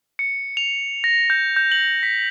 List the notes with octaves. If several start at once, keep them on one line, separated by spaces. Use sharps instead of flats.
C#7
F7
A#6
G6
G6
F#7
B6